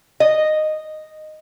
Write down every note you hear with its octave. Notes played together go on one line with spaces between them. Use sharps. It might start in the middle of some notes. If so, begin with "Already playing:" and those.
D#5